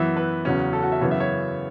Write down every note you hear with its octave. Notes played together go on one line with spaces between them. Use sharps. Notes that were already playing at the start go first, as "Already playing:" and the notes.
Already playing: F#2 E3 B3 E5
B4
E2 C#3 F#3 C#4
A4
F#4
E5
F#2 C#3 E3 B3 C#5
E5
C#5